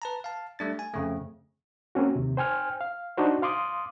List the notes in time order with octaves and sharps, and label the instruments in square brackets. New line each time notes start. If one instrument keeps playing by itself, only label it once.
[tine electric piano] B4 A5 A#5
F5 A5
G3 A3 D4 A6
G#5
F2 C#3 A3
[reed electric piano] A#3 C4 C#4 F#4
D#2 C3
C5 G5 G#5 F6
F5
D4 D#4 F#4 C5
F5 C6 D6 D#6